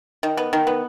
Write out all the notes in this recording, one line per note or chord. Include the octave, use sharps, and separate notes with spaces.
D#3
B3
D#3
B3